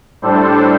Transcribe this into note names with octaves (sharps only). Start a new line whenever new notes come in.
A2 G3 D4 A4 C5